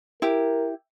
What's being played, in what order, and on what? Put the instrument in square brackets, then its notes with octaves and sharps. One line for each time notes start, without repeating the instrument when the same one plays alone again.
[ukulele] E4 G4 [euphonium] A#4